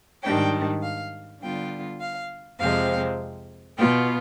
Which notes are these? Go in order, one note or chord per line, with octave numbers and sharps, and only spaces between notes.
G#2 D#3 G3 D4 G5
F5
D3 G3 B3 F4 G5
F5
F2 C3 F3 G#3 C4 F5
B2 B3 F4 G5